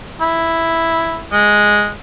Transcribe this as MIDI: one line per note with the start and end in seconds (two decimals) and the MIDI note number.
0.21 1.23 64
1.32 1.90 56